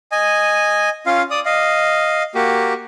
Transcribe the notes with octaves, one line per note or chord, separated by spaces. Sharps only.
D#5 G#5
C#4 F4 F5
D5 D#6
D#5 F5
A#3 F#4 G4